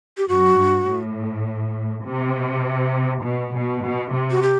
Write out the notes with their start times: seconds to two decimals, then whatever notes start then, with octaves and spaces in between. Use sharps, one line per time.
0.18 G4
0.28 F#2 F#4
0.58 G2
0.87 A2
2.05 C3
3.24 B2
3.54 B2
3.83 B2
4.13 C3
4.31 F#4
4.42 G4